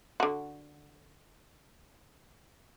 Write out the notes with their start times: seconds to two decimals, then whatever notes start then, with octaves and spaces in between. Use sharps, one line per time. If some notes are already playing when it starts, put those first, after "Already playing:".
0.20 D3 F#4